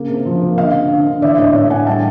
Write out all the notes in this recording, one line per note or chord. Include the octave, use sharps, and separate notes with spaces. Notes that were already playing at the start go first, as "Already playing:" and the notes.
Already playing: C#3 A#3
C3
F3
A#3
D3 D#5 F5
C4
D3
D3
E3 D5 E5
A2 C#5 D#5
A2 D5 E5
A2 F#5 G#5
G3 G5 A5